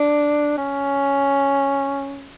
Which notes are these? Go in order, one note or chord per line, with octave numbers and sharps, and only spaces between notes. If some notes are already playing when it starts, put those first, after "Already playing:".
Already playing: D4
C#4